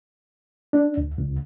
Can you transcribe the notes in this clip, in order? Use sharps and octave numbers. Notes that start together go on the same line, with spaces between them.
D4
D2
C#2